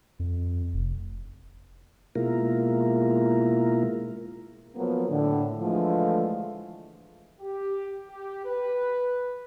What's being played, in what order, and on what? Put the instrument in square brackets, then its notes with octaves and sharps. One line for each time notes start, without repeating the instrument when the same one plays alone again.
[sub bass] F2
F1
[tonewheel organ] B2 G#3 A#3 E4 F4 A#4
[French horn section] F3 F#3 A#3 B3
A2 D3
D3 E3 F3 G#3 A3 F4
[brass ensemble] G4
G4
B4